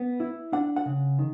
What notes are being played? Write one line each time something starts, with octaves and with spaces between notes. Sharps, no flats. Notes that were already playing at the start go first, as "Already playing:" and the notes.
Already playing: B3
E4
D4 F#5
F#5
C#3
D#3